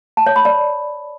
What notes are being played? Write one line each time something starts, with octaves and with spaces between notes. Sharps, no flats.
A5
C#5
B5
D5